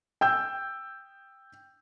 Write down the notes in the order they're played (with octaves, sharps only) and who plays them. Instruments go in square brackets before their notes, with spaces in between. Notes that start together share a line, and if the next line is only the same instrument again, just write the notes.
[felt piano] G5 E6 G6